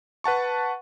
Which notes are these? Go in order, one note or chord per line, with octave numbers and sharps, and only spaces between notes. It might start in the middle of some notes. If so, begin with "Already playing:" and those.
B4 F#5 A5 C#6